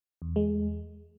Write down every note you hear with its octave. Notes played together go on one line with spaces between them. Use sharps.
E2
G#3